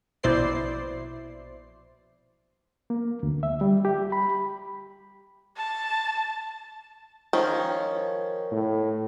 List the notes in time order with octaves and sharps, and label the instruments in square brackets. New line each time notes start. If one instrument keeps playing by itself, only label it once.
[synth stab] A#1 B2 E4 C5 D5 C7
[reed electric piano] A#3
D2
E5
G3
G4
B5
[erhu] A5
[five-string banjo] D#3 F3 C#4
[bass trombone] A2